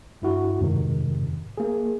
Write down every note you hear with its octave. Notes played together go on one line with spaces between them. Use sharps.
G2 E4 F#4
F2 G#2 C3 D#3
A#3 G#4